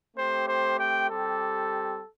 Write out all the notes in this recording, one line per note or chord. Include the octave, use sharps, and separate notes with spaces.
A3 C4 G4 C5
C5
G5
G3 C4 G4 A4